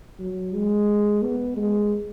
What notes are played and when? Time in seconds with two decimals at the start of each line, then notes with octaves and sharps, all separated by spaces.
0.19 F#3
0.53 G#3
1.23 B3
1.57 G#3